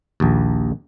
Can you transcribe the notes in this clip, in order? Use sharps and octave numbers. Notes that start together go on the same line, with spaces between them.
A#1 D#2